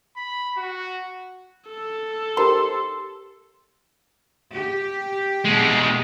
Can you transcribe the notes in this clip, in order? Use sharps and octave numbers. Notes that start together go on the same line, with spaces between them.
B5
F#4
A4
D#4 G4 A#4 C5 C6
G4
B2 G#3